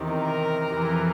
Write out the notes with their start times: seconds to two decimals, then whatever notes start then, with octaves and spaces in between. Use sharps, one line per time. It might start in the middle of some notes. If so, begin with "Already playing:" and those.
Already playing: E2 C3 D#3
0.14 A#4
0.73 F2 C3 E3